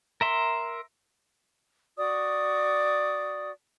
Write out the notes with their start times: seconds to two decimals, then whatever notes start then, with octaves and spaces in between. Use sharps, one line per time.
0.21 A#4 E5 C6
1.98 F#4 D5 D#6